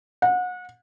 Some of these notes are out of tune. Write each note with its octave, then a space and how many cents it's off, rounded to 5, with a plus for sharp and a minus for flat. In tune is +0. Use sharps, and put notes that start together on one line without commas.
F#5 -30